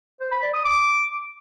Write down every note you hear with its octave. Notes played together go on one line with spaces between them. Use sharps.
C5
B5
D5
D#6
D6